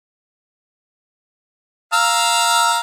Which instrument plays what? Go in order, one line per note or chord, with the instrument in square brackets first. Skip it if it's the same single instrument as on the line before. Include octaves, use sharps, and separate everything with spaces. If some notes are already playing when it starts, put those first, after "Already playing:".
[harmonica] F5 A#5 E6